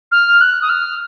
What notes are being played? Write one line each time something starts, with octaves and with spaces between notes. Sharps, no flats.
F6
F#6
D#6
F6